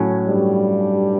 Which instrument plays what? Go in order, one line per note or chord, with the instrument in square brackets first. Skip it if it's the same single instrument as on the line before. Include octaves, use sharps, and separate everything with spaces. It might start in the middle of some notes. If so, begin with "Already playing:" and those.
Already playing: [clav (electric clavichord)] A2 F#3 C#4
[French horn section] G2 G3